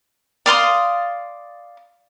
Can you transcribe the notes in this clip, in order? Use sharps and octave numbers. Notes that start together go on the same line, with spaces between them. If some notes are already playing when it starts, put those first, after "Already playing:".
D5 F5 C6 D#6